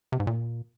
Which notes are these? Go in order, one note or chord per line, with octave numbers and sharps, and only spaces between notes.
C3
G#2
A#2